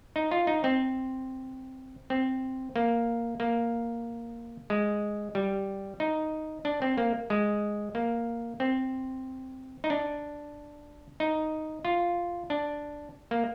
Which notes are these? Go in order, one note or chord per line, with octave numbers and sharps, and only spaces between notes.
D#4
F4
D#4
C4
C4
A#3
A#3
G#3
G3
D#4
D4
C4
A#3
G#3
A#3
C4
D#4
D4
D#4
F4
D4
A#3